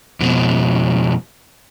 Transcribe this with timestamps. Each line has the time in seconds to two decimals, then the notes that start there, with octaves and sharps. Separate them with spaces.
0.20 F2 B2